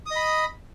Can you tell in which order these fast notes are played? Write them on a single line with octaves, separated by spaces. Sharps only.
D#6 D#5 B5